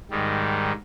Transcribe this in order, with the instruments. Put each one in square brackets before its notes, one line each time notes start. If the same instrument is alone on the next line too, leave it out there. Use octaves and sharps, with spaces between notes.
[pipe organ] G#2 D#3 G3